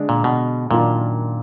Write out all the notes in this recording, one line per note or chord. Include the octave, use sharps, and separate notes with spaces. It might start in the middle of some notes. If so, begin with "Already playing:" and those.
Already playing: D3 G#3 D4
A#2
B2
F#2 A#2 D#3 A#3 D4 F4